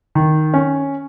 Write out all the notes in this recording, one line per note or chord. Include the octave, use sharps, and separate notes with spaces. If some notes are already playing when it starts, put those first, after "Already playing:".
D#3
C#4